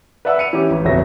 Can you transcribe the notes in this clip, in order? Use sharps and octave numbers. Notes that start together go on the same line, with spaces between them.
B4 D5 E5 F#5 B5 E6
C#7 D#7 F7
E3 C#4 G4 D6
A1
F1 D2 B2 C#5 E5 A#6